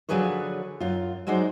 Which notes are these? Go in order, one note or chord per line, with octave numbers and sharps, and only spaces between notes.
D3 F3 F#3 G#4 B4 C#5
F#2 F4
F#3 G#3 D#4 F#4 C5 D5